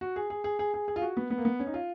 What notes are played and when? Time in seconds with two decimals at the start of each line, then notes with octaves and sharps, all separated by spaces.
0.01 F#4
0.16 G#4
0.30 G#4
0.44 G#4
0.59 G#4
0.74 G#4
0.88 G#4
0.96 F4
1.02 F#4
1.17 B3
1.30 B3
1.38 A#3
1.45 B3
1.60 C#4
1.67 D#4
1.74 F4